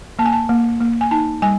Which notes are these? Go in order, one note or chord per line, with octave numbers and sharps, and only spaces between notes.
A#3 A5
G#5
A5
A#3
A#3
G#5
D#4 A5
G3 G#5